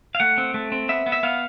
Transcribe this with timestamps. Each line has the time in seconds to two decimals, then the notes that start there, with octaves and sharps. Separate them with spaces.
0.15 F5
0.20 A3 F#5
0.38 C4
0.54 A3
0.72 C4
0.89 B3 E5
1.06 B3
1.12 E5
1.23 B3 F5